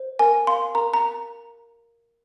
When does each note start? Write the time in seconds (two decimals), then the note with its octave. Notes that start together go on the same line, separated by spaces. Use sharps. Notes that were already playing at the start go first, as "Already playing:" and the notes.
Already playing: C5
0.19 A#4 G#5
0.47 F5 C6
0.75 A#4 A#5
0.93 A#5